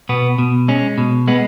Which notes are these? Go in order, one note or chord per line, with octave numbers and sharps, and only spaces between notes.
B2 B3
B2
G#3 C#4
B2
G#3 B3